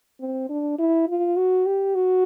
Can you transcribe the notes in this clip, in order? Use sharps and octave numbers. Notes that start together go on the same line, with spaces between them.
C4
D4
E4
F4
F#4
G4
F#4